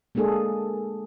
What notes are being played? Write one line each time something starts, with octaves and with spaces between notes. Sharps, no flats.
G#3 A#3 D4 G#4 A4